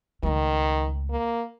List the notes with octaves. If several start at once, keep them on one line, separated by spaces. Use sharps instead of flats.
C#2 D#3 A3
A#3